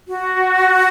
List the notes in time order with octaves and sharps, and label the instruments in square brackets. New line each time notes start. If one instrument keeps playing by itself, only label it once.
[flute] F#4